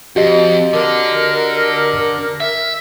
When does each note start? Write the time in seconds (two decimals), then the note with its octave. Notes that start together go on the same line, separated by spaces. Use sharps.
0.16 F2 F#4 G4 D#5
0.73 D3 A#4
2.40 E5